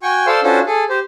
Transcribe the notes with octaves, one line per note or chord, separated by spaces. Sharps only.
F#4 G5 G#5 C#6
A4 C5 D5 F5 C6 E6
C#4 D4 F4 F#4 A4 C5
G#4 A4
G4 C5